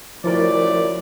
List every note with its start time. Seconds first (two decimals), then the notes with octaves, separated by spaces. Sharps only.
0.24 F#2 F3 A3 E4 A#4 D5